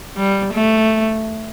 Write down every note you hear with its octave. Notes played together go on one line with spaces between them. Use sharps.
G3
A3